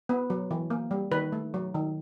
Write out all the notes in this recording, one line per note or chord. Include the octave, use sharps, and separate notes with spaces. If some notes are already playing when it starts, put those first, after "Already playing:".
B3
F#3
E3
A#3
G3
D#3 B4
A3
F#3
D#3